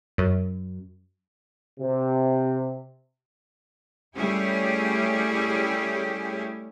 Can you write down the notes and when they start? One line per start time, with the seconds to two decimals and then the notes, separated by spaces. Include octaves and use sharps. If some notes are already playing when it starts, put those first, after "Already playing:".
0.18 F#2
1.80 C3
4.17 G3 A3 C#4 E4 G4 G#4